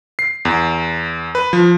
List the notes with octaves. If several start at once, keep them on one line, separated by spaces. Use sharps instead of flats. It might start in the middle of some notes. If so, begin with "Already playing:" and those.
C7
E2
B4
F3